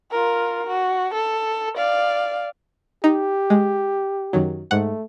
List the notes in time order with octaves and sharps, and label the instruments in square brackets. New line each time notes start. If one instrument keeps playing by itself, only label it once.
[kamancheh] F4 A#4
F#4
A4
D5 F5
[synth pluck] D#4 [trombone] G4
[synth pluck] G#3
F#2 D#3 F#3
[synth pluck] G#2 F#5 [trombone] A3